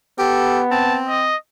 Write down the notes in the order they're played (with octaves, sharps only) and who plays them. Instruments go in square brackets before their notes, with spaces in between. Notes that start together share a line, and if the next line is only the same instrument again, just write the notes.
[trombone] B3 [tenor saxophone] G4 [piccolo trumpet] A4
[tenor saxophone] C4 [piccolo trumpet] A5
[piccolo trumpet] D#5